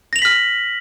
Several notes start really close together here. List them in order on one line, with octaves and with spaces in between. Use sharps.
A#6 F7 F#7 B6 F6